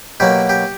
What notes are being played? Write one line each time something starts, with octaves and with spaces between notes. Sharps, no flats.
B2 F#3 A#3 G4
G4